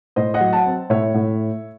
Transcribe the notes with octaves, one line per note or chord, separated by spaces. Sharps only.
A2 C5 D#5
D#5 F#5
F#3
F#5 A5
C4
A2 C#5 E5
A2